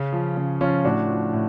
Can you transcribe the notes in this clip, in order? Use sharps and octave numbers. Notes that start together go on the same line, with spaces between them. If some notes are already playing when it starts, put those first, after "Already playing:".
Already playing: C#3 C#4
F3
C#3
F3 C#4 F4
A2 D4 F#4
F3
A2